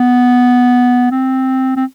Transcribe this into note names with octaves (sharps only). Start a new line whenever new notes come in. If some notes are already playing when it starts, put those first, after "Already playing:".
Already playing: B3
C4
C4